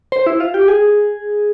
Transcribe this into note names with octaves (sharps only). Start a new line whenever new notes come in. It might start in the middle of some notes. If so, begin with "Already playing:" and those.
C5
E4
F4
G4
G#4